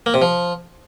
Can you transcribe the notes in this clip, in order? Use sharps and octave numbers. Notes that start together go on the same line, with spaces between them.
A#3
C3
F3